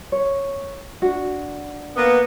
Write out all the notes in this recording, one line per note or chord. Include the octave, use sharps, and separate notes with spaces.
C#5
D4 F#4
A#3 B3